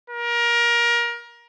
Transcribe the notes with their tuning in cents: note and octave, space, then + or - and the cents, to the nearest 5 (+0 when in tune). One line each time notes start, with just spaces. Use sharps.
A#4 +25